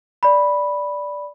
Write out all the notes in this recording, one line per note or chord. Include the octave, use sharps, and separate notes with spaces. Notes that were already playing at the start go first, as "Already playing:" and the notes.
D5 B5